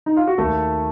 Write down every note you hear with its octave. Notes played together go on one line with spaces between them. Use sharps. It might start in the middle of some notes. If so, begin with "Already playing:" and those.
D#4
F4
F#4
D#2 A3 A4